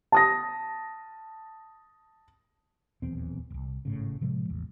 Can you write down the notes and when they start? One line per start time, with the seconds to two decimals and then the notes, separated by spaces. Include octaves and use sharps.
0.12 A5 D#6 A#6
3.02 D#1 B1 E2 C4
3.50 D1 C2
3.85 G#1 A2 C#3
4.21 A2 C3 F3 G#3
4.49 A1 E2